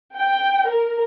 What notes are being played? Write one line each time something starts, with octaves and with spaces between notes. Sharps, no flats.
G5
A#4